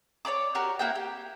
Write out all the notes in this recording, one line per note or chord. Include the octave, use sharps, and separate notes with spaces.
C#5 D5 B5 D6
F#4 G4 A#4
A#3 E4 F#4 G5
G4